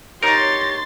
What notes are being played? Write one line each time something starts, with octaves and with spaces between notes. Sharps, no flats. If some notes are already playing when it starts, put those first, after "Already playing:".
D#4 G4 A#4 C#5 A#5 C6 A6